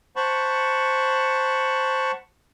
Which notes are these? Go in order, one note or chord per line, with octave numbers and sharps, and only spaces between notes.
C5 F#5 A5 B5 C#6